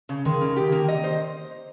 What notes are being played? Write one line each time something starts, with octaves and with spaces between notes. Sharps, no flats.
C#3
D#3 G#3
C#3
G4
A#3
D#5
C5